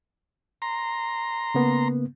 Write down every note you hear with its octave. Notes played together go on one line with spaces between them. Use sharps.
A#5 C6
C#3 A#3 B3